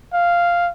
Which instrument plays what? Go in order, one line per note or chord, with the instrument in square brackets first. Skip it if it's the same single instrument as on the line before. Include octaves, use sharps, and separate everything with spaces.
[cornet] F5